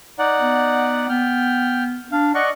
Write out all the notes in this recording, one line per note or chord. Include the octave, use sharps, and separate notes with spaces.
D#4 D5 F#5
B3
B3 G5 F6
D4 F5
D5 D#5 F#5 C#6